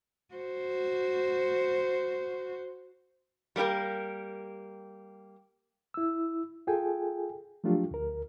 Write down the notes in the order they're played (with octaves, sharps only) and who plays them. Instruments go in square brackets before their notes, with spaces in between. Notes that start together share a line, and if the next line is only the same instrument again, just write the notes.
[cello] F#4 C5
[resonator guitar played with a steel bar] G3 A#3 C#4 G4 A#4
[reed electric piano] E4 E6
F4 G#4 A4 G5 G#5
F3 F#3 A3 D4 F4 G4
D2 A#4